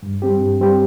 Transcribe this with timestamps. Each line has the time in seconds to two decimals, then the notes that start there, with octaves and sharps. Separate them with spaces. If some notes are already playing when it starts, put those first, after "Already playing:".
0.03 G2
0.22 G3 C4 G4
0.40 G2
0.60 G3 C4 G4